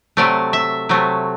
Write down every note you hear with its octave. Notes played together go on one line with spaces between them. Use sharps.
C3 F#3 A3 D5
E5
C3 F#3 A3